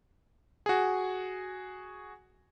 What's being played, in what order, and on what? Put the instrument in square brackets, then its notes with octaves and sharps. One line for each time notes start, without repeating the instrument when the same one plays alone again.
[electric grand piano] F#4 G#4